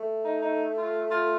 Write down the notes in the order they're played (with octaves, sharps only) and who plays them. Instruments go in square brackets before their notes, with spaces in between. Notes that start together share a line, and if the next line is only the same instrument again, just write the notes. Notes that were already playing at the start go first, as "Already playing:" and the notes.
Already playing: [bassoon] A3
[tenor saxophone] D#4
D#4
F4
F4